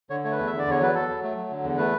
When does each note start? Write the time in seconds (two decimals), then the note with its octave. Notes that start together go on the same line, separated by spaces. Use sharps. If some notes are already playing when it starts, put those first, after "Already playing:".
0.10 D3 C#5
0.24 A3 C#5
0.32 B4
0.39 E2
0.47 E5
0.52 D3
0.59 D5
0.67 E2 C#5
0.81 F#3 B4
0.95 F#3 A4
1.09 F#3
1.23 A3
1.37 F#3
1.50 D3
1.64 E2
1.78 A3 B4